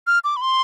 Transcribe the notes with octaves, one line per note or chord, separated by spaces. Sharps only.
F6
D6
B5
C6